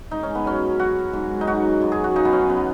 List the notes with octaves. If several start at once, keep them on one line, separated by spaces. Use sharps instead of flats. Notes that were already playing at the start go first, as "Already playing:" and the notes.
G#2 D#4
C#4
B3
F#3 C#4
F#3 F#4
G#2
D#4
F#3 F#4
F#2
G#4
F#4
C#3 D#4
B3
C#4
B3